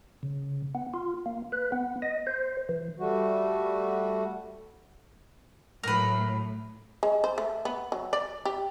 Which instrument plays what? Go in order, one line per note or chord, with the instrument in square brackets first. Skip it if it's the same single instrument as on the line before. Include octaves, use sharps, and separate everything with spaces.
[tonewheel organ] C#3
B3
F4
A#3
B4
B3
D#5
C5
E3
[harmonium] G3 A3 F#4
[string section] A2 F#3 [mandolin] A#4 B4
[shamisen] G#3
C5
A3
B3
F#3
D5
G4